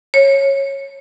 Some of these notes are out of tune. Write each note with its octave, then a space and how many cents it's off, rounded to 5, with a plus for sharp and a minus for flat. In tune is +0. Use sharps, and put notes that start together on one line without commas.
C#5 -15